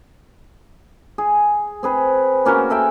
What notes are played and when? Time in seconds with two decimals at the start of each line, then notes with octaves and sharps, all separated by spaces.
1.18 G#4
1.83 C4 G#4 B4
2.45 A#3 C#4 F#4 A#4
2.70 A4 E5 G5 G#5